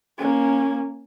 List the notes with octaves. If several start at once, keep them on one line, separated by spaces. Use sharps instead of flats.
A#3 C#4